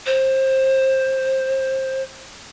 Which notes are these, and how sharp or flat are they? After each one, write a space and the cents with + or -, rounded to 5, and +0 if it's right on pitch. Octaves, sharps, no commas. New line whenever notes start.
C5 +20